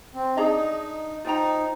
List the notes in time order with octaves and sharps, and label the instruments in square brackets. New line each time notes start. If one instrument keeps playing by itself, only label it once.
[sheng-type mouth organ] C4
[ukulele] D4 G#4 D#5 A#5 [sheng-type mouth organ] D#4
[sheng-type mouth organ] D#4 [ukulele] F4 C5 G5 A#5